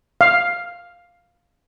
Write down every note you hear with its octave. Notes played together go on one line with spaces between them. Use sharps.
F5